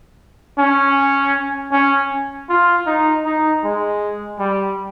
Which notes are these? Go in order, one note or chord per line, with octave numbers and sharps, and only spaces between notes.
C#4
C#4
F4
D#4
D#4
G#3
G3